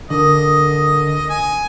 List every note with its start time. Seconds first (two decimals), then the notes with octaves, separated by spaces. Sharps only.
0.10 D3 D4 A#4 D#5 D#6
1.30 G#5